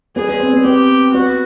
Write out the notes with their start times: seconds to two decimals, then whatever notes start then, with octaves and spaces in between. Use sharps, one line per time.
0.16 B3 G#4
0.29 B3
0.40 C4
0.53 B3
0.64 B3 G4
1.13 B3 F#4